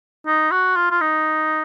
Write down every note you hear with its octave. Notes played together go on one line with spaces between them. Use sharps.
D#4
F#4
F4
F4
D#4